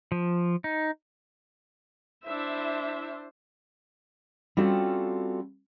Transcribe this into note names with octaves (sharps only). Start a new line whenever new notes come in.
F3
D#4
D4 E4 C5 E5
G3 C4 C#4 F4 F#4 A4